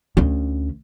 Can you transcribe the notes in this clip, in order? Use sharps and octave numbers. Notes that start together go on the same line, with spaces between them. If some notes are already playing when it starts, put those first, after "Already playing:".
D2 C#4